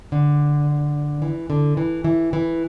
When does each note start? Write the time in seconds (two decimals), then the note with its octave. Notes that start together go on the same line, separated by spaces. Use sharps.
0.12 D3
1.22 E3
1.50 D3
1.77 E3
2.04 E3
2.33 E3